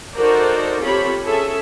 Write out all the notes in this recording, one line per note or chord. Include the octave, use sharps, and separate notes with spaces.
D#4 F#4 A4 A#4 C5 D5
C4 F4 G4 A4 C#5 B5
C#4 G#4 A4 E5